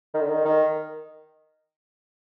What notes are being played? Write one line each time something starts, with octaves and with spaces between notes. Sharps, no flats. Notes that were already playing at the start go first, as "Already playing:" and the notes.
D#3
D3
D#3
D#3